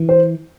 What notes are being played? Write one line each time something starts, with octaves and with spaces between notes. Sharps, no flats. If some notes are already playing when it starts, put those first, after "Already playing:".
Already playing: E3
C5